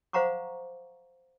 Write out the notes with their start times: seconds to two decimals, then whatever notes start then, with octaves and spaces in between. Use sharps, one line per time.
0.13 C5 F5 F#5 A#5 C#6 D6